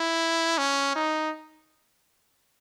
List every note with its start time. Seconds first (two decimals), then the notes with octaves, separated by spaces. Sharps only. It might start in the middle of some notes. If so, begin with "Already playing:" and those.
Already playing: E4
0.58 C#4
0.96 D#4